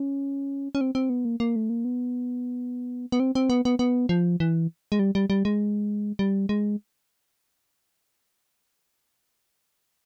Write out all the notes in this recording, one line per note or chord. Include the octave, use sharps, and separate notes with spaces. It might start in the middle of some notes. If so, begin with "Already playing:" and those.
Already playing: C#4
C#4
C4
C4
B3
A#3
A#3
A3
A#3
B3
B3
C4
C4
B3
B3
B3
F3
E3
G#3
G3
G3
G3
G#3
G3
G#3